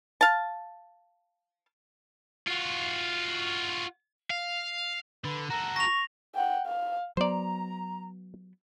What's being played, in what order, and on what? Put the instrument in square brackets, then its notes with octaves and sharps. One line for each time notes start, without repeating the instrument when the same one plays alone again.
[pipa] F5 A5
[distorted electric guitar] F4 F#4
F5
[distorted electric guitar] D3 [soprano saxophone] B4
[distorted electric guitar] F#4 A4 [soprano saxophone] A#5
[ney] C#6 [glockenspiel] A#6 F7
[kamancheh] F#5 G5
F5
[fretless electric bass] F#3 B3 [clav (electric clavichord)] C5 D5 [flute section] A#5